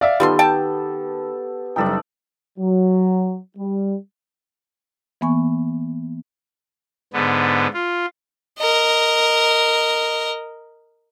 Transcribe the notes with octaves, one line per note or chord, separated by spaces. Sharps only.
D5 E5 F5
D#3 G3 B3 F4 G4 A4 C6
G5 A5
F#1 G3 D#4 A4 D5 G5
F#3
G3
E3 A#3 B3 G#5 C#6
G#2 D3 B3
F4
A#4 D#5